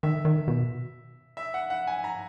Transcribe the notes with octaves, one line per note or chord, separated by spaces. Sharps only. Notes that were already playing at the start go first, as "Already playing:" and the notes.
D#3 E5
D#3
B2
E5
F#5
F#5
G#5
A#5